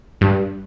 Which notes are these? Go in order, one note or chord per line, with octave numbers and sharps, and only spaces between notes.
G2